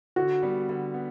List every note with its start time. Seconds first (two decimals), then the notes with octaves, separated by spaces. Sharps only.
0.16 D3 F#4
0.42 G3 B3
0.69 D3
0.94 B3